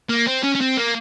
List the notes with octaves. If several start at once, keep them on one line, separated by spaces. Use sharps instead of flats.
A#3
C4
C#4
C#4
C4
A#3